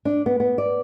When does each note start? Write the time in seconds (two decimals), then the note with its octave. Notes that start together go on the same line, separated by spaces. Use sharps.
0.05 D4
0.26 B3
0.40 B3
0.58 D5